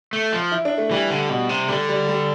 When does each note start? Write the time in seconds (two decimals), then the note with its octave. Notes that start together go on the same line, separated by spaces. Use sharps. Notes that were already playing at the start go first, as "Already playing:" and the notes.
0.13 A3
0.33 F3
0.52 E4
0.65 D4
0.78 A3
0.91 E3 G3
1.10 D3
1.30 B2
1.49 C3
1.68 D3 G3
1.89 G3
2.08 G3